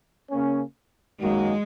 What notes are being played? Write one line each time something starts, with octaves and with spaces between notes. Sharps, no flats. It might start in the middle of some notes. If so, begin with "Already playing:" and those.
C#3 A#3 C#4
F#2 D#3 F#3 G#3 A#3 F#4